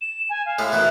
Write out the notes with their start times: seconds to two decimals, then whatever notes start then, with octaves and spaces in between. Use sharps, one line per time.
0.01 E7
0.30 G#5
0.46 F5
0.59 A2 G#3 A3
0.72 B2 D#3 A3 F#6